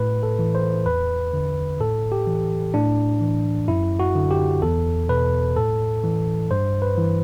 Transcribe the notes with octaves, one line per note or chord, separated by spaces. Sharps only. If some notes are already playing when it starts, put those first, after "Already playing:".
Already playing: A2 B4
A4
E3
C5
E2 B4
D3
A2 A4
G4
E3
A2 D4
E3
F#2 E4
F#4
D3
G4
E2 A4
B2 B4
A2 A4
E3
G2 C5
B4
E3